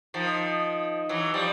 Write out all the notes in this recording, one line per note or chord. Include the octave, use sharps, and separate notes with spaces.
D#3 F3
E3 F#3
F3 G3